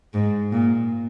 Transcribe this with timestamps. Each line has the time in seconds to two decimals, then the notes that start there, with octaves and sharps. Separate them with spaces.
0.14 G#2
0.52 A#2